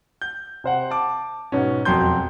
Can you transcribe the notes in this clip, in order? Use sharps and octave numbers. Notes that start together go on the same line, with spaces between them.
G6
C3 C5 F#5
A5 D6
G#2 B2 C#4
E1 F2 F#3 C6 G6